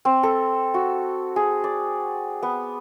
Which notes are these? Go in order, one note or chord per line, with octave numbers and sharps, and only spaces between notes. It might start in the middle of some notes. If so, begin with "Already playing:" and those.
C4
A4
F#4
G#4
D5
B3